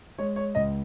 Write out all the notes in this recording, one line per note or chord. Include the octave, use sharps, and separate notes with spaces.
G#3 C#5
C#5
C#2 D#5